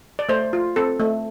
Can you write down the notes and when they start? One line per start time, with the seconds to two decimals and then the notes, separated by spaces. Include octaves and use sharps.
0.19 D5
0.29 A3 C5
0.53 F4
0.76 C4 A4
1.00 A3